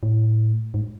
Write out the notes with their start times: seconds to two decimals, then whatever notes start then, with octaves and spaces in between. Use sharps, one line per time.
0.03 A2
0.74 G#2